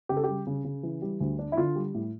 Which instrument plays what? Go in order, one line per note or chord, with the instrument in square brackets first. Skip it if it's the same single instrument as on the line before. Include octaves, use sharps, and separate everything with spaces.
[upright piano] C#3 G4
A4
G3 G4
C#3
C#3
E3
G3
D2
D4
E4
D3 F4
G3
A2